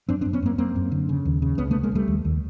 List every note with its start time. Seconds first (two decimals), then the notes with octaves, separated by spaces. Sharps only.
0.09 F#2 C4 D4
0.21 C4 D4
0.25 F#2
0.33 B3 C#4
0.42 F#2 A#3 C4
0.58 F#2 A#3 C4
0.76 F#2
0.92 D3
1.09 C#3
1.25 D#2
1.42 C#3
1.58 C#2 B3 C#4
1.71 A3 B3
1.75 C#2
1.83 G#3 A#3
1.92 C#2 G3 A3
2.08 D#2
2.25 D#2